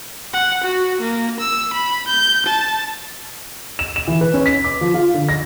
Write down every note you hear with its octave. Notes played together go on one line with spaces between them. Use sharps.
F#5
F#4
A#3
E6
B5
G6
A5
E7
E7
E3
B4
C#4
B6
D6
F3
F4
D3
A#6